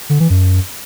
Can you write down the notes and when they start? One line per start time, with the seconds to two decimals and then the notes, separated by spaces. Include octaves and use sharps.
0.10 D3
0.20 E3
0.30 F#2